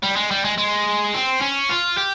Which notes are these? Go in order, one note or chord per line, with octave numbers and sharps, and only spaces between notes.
G3
G#3
G3
G#3
G#3
C4
C#4
F4
G4